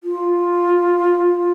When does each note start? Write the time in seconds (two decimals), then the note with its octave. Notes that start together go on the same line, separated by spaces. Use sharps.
0.04 F4